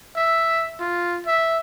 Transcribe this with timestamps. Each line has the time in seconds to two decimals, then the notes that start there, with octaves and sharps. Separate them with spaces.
0.16 E5
0.80 F4
1.27 E5